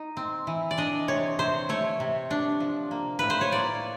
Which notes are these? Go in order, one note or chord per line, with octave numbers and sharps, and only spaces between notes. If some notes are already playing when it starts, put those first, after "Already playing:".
Already playing: D#4
C4
E3
D5
D4 D#5
C3 C#5
C3 C5
A3 C#5
C3
D4
F3
A#3
A2 B4
C5
C#5
A#3 D5